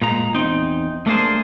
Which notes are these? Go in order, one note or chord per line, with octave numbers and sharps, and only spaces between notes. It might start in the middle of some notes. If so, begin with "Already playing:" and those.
A#2 G#3 A#5
E2 C4 D#4
A3 A#3 D4 G#4 C5